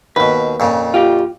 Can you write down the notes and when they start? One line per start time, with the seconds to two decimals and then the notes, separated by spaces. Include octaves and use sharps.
0.16 D#2 B2 B4
0.60 F2 A#2 C#3
0.94 F4 G4